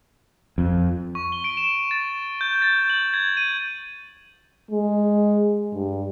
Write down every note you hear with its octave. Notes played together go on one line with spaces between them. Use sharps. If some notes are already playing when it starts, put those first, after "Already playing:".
F2
C#6
G7
D7
E7
A6
G6
A6
F#7
G#6
D#7
G#3
G2